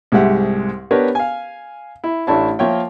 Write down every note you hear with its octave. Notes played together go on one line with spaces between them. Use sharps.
C2 G#2 G#3 G4 E5 F#5
B3 D4 G4 A#4 B4 C#5
F5 G#5
E4
A1 A3 D4 E4 C#5 A5
F3 A#3 F4 C#5 E5 G5